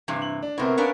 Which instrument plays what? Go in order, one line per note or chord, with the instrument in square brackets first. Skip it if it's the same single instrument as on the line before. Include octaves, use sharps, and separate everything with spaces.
[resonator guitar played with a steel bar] G2 C3 E3
[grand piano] F#7
D4
[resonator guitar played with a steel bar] A2 C3 [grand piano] B3 C4 A#4
[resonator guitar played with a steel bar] B3 D4 A#4 [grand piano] C#4 B4 F5